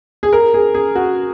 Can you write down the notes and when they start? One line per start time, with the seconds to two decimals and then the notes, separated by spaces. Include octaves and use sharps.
0.23 G#4
0.33 A#4
0.54 G#4
0.74 G#4
0.95 F#4